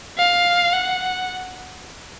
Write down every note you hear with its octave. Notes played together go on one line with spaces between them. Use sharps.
F5
F#5